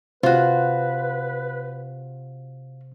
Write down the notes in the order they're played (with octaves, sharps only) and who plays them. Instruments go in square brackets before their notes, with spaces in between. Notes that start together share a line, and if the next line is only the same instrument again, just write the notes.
[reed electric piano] C3 C5 [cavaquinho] F4 F#4 [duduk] B4